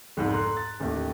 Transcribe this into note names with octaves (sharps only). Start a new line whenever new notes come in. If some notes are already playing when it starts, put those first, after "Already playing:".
C2 F2 G#2 B2
A4 A#5 C6 F#6
A6
A1 D#2 A3 G4